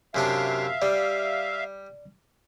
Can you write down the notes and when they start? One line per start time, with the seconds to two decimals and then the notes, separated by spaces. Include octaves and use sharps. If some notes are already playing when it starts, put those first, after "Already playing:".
0.15 F#2 C3 D4 E5 F5
0.82 G3 D5